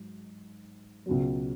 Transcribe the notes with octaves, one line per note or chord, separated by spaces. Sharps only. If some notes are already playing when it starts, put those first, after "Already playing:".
Already playing: G#2 F#3
C#2 B2 F#3